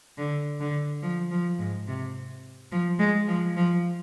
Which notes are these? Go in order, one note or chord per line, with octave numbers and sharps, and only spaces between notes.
D3
D3
F3
F3
G#2
C3
F3
G#3
F3
F3